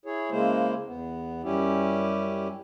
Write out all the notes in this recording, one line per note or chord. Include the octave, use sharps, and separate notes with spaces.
E4 G#4 C#5
C#3 G#3 A#3 E4 C5
E2 B3
F#2 G3 C#4 E4 G4